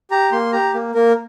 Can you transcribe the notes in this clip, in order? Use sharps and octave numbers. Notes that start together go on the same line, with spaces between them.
G4 A#5
A#3 C6
G4 A#5
A#3
A#3 A#4